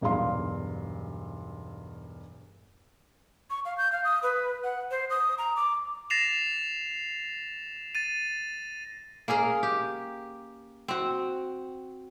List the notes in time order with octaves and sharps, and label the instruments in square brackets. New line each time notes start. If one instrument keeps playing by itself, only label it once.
[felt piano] E1 B1 G2 G#4 F5 C6
[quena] C#6
F5
G6
F5
D#6
B4
F#5
C5
D#6
A#5
D6
[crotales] A6 A#6 C7 E7 F7
A6 D#7
[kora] A#3 C#4 G#4 A#4
G4
C4 F#4